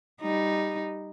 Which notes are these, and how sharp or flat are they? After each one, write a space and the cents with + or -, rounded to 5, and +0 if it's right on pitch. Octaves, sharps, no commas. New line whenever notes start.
G3 +0 D#4 +0